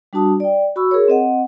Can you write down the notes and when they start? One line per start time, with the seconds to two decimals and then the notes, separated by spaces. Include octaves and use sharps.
0.13 G3 D4 F#4 A5 D#6
0.40 D5 G5
0.76 F#4 B5 C#6 E6
0.91 G#4 A#4 C#5
1.08 C4 D#5 F#5